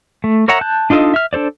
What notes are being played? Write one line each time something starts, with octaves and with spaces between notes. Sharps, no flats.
A3
A#4 C#5 E5 F#5 A#5
A5 F#6 G6
D4 D#4 F4 A4 D#5
E5 F6
D4 A4 C5 D5